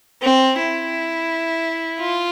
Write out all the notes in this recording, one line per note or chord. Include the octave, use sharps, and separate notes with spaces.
C4
E4
F4